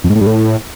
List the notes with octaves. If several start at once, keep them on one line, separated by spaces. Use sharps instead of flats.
F2
G#2
A2
G2
A2